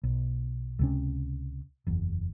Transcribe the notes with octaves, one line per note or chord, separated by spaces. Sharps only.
B1
C#2 C3 C#4
F#1 E2